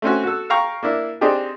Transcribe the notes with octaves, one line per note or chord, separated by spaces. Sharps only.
A3 C4 C#4 F#4
F#4 A4
F5 G5 A#5 C#6
A#3 D4 E4
C4 D4 D#4 G4 G#4